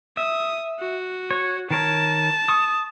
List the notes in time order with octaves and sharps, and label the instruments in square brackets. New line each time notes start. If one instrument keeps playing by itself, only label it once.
[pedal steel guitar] E5 [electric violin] D#6
[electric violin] F#4
[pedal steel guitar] C#5
[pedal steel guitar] D#3 A#4 C#5 [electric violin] A5
[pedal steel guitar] C#6 D#6